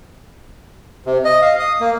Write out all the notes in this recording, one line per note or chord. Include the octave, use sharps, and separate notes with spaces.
C3
D#5
F5
D#6
A#3